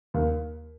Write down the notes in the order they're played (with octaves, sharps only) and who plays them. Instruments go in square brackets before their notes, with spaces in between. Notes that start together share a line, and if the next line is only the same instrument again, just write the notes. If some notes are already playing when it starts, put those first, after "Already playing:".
[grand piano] D#2